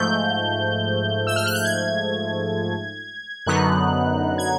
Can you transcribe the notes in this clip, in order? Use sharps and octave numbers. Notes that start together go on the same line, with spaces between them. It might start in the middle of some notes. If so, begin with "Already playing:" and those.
Already playing: G#2 F3 A3 G6
E6
F6
F#6
G6
G#6
F#2 D3 F#3 B3 D#4 F#6
G#6